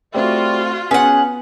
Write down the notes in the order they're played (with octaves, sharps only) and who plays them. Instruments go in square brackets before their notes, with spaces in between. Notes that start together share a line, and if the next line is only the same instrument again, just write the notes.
[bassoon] G3 [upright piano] A3 C4 [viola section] F4 F#4
[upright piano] B3 [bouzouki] C#4 F#5 [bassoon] G#4